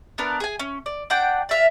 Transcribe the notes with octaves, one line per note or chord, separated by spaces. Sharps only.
B3 D4 A#4
G#4 G#5
C#4
D5
D4 F#5 G5 D6
D5 E5 F5